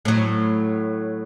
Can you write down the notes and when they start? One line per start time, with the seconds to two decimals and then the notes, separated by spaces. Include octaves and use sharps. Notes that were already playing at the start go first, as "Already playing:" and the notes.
0.05 A2 F#3